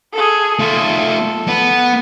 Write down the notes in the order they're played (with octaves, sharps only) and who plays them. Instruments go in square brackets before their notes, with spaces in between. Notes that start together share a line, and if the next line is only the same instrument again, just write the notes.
[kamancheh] G#4 A4
[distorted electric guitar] A3 F4 [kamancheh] A4
[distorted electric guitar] B3